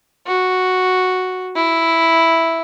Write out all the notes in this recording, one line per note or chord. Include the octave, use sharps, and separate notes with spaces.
F#4
E4